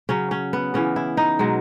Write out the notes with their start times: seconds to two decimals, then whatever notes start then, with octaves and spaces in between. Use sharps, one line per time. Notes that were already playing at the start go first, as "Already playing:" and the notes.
0.09 C#3 F#3 C#4
0.31 C#4
0.53 B3
0.74 C#3 E3 C#4
0.96 E4
1.17 D#4
1.39 B2 F#3 G#3